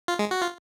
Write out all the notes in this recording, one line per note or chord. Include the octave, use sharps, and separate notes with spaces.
F4
G#3
F#4
F4